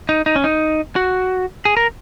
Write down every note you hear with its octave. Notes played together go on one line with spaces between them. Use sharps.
D#4
D#4
C#4
D#4
F#4
G#4
A#4